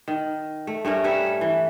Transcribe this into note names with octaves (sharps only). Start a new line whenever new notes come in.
D#3
A3
G2 A3 C#4 A#4
G3 B4 C#5 E5
A4
E3